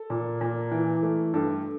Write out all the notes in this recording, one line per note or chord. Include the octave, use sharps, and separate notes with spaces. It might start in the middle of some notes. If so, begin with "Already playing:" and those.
Already playing: A4
A#2
A#2
E3
A3
G2 A4